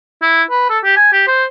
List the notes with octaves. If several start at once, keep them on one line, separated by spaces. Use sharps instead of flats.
E4
B4
A4
G4
G#5
G4
C5